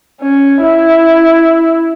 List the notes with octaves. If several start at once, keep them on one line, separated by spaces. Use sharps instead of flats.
C#4
E4